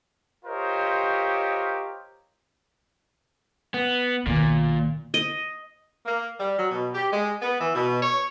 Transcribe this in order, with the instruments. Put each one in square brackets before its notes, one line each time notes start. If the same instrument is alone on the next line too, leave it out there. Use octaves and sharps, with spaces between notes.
[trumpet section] F4 G4 A#4 C5 C#5 D#5
[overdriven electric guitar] B3
[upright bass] B1 D#3 [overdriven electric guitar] A#2
[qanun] D#5
[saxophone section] A#3
G3
F#3
B2
G4
G#3
B3
E3
B2
C#5